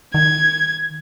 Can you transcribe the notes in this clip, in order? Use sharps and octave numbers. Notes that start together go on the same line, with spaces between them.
D#3 G#6